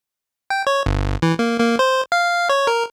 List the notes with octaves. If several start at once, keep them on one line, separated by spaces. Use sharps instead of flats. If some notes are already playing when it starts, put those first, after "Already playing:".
G5
C#5
G1
E3
A#3
A#3
C5
F5
C#5
A#4